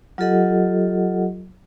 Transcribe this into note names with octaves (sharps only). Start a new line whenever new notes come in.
F#3 F4 G4 A4 D#5 F#5